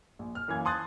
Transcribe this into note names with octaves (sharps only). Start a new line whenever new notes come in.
A#1
F6
F#2 E3 A#3 G#6
A5 C6 D#6 F#6 A6